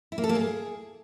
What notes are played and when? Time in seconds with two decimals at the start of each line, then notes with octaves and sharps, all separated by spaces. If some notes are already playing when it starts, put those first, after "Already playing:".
0.12 E4
0.18 A#3
0.24 A4
0.29 A#3
0.35 G#4